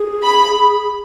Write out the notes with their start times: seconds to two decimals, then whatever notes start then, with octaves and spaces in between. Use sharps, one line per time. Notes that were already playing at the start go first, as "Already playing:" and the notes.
Already playing: G#4
0.23 B5